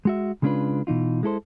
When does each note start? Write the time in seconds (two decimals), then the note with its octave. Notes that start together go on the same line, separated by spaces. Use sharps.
0.05 G#3 F#4 E5
0.42 C#3 G#3 C#4 D4 F4 B4
0.87 B2 E3 D#4 F4
1.23 G#3 E4 A4 C5